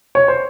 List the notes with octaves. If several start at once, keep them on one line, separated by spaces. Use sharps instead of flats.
C#5
C5